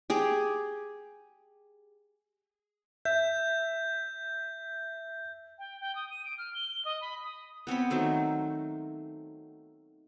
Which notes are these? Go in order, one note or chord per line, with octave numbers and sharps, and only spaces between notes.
G4 G#4
E5 G6
G5
G5
D#6
D#7
D7
F6
G7
D#5
B5
D#6
B3 C4 C#5 B5
D#3 F#3 A3 C5